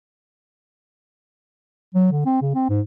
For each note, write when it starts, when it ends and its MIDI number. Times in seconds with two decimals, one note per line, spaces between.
1.95 2.10 54
2.12 2.25 50
2.26 2.40 60
2.42 2.53 49
2.55 2.66 60
2.69 2.81 44